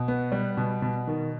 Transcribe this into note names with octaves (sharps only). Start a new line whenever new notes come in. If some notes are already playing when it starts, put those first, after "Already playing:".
Already playing: B2
B3
G3
B2
B2
D#3